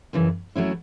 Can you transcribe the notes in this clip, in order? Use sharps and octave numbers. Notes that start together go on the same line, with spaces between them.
F#2 C#3 E3
F#3 A3 C#4 E4